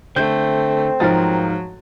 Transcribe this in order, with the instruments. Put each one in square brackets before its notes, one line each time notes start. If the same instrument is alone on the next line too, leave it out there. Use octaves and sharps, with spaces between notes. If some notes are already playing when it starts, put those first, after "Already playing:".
[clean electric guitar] D3 [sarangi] A3 [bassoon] C4 [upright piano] G6
[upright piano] G#2 F3 A6 [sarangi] F#3 [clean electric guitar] D#4 A#4